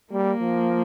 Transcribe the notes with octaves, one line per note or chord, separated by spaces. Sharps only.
G3 A#3
F3